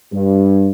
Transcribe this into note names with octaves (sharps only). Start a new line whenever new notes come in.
G2